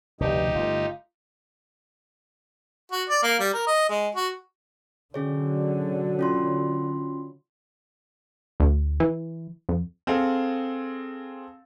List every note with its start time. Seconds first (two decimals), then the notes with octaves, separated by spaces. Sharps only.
0.20 F1 D2 G2 B2 D#4 G4
0.55 G1 A3 F4
2.92 F#4
3.09 D5
3.23 A#3
3.40 G3
3.54 A#4
3.67 D#5
3.89 G#3
4.15 F#4
5.14 D3 F#3 C#4 G#4 C#5
6.19 C#4 F4 C6
8.60 D2
9.00 E3
9.69 F2
10.07 C4 G#4 A4 F5